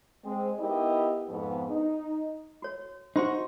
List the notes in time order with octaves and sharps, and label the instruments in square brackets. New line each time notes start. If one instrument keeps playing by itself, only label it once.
[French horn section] G#3 C4
B3 D#4 E4 G4 A#4 D#5
F2 G#2 B3
D#4
[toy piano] F#4 C#5
[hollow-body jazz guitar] D#4 F#4 [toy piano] G4 C5 C6